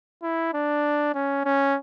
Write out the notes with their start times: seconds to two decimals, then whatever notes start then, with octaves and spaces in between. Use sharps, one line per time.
0.23 E4
0.54 D4
1.14 C#4
1.45 C#4